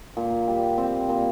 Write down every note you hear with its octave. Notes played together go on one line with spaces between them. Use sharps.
A#2
G3
C4
A#2